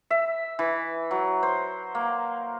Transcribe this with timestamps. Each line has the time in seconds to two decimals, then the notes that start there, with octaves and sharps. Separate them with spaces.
0.10 E5
0.59 E3
1.11 F#3
1.43 C5
1.95 A#3